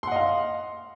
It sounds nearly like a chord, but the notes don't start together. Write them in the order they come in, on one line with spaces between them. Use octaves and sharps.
C6 F#5 D#5 F5